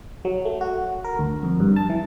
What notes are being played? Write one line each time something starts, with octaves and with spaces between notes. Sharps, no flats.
F#3
A3
F#4
A#4
D2
F2
G2
A5
E3